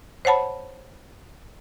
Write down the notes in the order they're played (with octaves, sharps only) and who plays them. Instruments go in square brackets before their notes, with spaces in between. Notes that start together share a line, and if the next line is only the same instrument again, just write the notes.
[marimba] C5 C#5 F#5 A5 B5